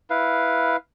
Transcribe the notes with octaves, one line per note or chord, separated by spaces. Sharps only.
E4 B4 F5